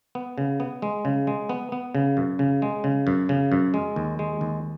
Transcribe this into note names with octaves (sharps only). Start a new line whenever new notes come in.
B3
C#3
B3
G#3
C#3
G#3
B3
B3
C#3
F#2
C#3
G#3
C#3
F#2
C#3
F#2
G#3
D#2
G#3
D#2